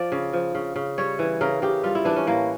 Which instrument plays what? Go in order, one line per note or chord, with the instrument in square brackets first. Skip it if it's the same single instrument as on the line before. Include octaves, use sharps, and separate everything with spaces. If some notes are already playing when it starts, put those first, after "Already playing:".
Already playing: [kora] F3 D5
C#3
F3
C#3
C#3
G3 C#5
E3
C#3 A#4
C#3 G4
G3 F4
E4
E3 D4
C#4
A2 A#3